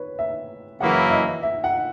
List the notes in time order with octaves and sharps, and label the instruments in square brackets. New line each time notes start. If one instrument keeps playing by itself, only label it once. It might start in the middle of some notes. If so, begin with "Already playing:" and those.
Already playing: [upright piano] B4 C#5
E5
[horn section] F#2 C#3 E3 A#3 E4 [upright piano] F#5
[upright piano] D#5
E5
E5
F#5